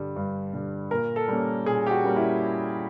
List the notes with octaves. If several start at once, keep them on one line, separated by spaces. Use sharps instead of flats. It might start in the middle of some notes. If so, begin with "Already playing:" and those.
Already playing: G2 D3 G3
G2
D3 G3
A#2 A#4
A4
G3 A#3 C#4
A#2 G#4
G4
F#4
G3 A#3 C#4
E4